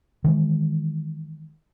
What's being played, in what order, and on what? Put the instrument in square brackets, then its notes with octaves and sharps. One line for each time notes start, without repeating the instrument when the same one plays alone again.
[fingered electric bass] D#3 E3 G#3